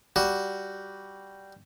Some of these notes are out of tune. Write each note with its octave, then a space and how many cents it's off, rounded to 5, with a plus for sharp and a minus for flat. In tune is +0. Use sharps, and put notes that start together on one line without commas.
G3 -5 F#4 +0